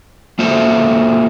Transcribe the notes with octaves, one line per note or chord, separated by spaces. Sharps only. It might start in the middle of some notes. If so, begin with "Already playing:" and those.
A#3 F4 F#4 A4 C5 E5